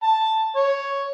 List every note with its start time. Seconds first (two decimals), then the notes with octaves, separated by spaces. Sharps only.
0.03 A5
0.56 C#5